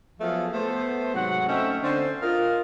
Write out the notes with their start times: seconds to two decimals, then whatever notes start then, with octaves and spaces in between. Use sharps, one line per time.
0.20 F3 F#3 A3 B3 G#4 A4
0.53 A3 B3 C5
1.14 G#2 C3 F#3 F#5
1.48 A3 C4 C#4 D#5 E5 G5
1.82 D3 C4 C#4 C5
2.22 F4 A#4 D#5